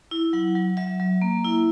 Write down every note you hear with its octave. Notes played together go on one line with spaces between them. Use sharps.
E4
F#3 F#5
F#3
F#3 E5
F#3
A#3
E4